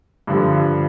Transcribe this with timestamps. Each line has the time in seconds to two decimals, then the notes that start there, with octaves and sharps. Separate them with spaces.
0.27 G2 D3 F3